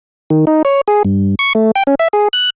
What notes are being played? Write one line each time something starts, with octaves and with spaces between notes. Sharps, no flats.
D#3
D#4
C#5
G#4
G2
C#6
A3
G5
C#4
E5
G#4
F#6